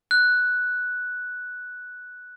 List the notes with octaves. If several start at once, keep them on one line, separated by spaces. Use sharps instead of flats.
F#6